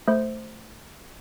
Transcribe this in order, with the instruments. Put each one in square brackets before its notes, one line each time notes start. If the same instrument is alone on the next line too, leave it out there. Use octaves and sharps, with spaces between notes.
[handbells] A3 C5